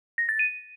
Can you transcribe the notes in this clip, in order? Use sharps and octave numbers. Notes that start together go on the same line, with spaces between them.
A#6
A6
D#7